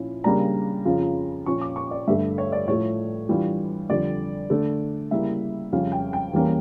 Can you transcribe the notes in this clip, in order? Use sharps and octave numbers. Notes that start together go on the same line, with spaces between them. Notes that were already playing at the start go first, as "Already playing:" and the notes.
Already playing: A#2 F3 C#4 E4
C#3 G3 A#3 D4 A#5
F2 C#3 F3 C#4 F4
A#2 F3 C#4 F4 C#6
D6
C#6
D5
G2 D3 A3 E5
C#5
D5
A2 F3 A3 C#5
E3 G3 D4 F4
F2 D3 G3 D5
D3 A3 D4
C#3 G3 A#3 E4 E5
F2 C#3 G3 C#4 F4 F5
G5
G5
E2 E3 G3 A#3 C#4